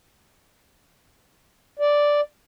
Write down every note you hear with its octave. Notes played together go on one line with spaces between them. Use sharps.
D5